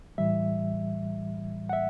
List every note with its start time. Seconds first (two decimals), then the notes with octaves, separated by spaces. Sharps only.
0.18 A2 E3 G3 E5
1.69 F#5
1.73 E5